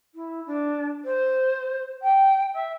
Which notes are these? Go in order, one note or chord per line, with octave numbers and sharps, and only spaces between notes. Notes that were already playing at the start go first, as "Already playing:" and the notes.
E4
D4
C5
G5
E5